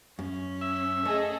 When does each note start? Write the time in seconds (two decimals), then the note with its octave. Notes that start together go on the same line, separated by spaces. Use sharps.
0.19 F#2 C#4
0.61 E5
1.05 A3 G#4 A4 D#5